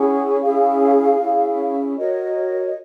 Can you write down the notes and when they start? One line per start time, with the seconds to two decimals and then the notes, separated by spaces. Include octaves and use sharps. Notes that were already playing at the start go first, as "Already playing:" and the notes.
Already playing: C#4 E4 G#4 F#5
0.42 C#4 E4 G#4 F5
1.19 C#4 E4 G#4
1.97 F#4 A#4 C#5 D#5
2.67 D#5